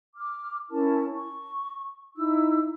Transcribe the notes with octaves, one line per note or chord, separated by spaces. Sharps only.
D6 F6
C#4 E4 A#4 A5
C#6
D#4 E4 E6